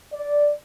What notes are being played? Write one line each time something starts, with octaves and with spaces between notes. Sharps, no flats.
D5